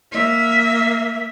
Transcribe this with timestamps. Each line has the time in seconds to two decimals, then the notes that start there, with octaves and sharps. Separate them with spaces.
0.12 A#3 E5